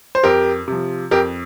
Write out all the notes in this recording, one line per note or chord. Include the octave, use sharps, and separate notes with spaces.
C5
F2 G4 A#4
C3 F3
F2 G4 A#4